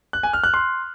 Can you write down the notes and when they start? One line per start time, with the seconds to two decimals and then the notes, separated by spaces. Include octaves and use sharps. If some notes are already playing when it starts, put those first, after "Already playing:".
0.13 F#6
0.23 G#5
0.33 F6
0.44 F#6
0.54 C6